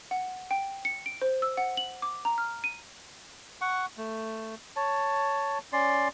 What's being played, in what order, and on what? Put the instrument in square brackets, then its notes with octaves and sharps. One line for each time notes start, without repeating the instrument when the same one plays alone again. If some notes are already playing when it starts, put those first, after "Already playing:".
[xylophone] F#5
G5
C#7
D7
C5
E6
F#5
F#7
D6
A#5
F6
D#7
[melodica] F#5 C#6
A3
C#5 A5
C#4 D5 C6